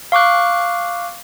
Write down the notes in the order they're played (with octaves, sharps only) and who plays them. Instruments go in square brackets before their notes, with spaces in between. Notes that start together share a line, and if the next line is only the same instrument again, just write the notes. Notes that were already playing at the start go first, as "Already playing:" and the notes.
[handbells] F5 C#6 D6 F#6